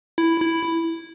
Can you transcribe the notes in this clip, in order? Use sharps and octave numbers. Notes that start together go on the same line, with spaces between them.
E4
E4